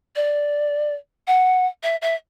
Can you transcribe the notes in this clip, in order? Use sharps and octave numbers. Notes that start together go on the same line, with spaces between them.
D5
F#5
E5
E5